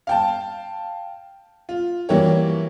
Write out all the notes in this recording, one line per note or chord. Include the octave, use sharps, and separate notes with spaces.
F5 G5 A5
F4
E3 F#3 G3 A#3 G4 C#5